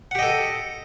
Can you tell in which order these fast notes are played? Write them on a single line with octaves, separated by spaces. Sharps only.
F#5 G4 D#5 A4